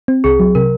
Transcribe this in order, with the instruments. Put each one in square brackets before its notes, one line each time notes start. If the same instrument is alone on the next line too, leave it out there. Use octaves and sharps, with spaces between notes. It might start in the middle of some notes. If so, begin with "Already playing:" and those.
[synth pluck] C4
[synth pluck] C2 [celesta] G#4
[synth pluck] F#3
[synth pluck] C3 [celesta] A#4